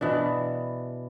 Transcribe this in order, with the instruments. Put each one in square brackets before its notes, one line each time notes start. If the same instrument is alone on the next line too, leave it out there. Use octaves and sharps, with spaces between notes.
[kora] B2 E3 D4